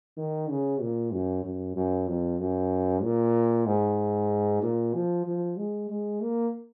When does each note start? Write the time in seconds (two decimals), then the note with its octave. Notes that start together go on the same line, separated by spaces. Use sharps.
0.17 D#3
0.50 C#3
0.81 A#2
1.13 F#2
1.44 F#2
1.76 F#2
2.08 F2
2.40 F#2
3.03 A#2
3.66 G#2
4.62 A#2
4.94 F3
5.26 F3
5.57 G#3
5.90 G#3
6.21 A#3